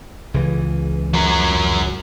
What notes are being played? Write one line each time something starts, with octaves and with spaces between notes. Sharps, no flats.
C#2 C#3 E3
F#3 A#4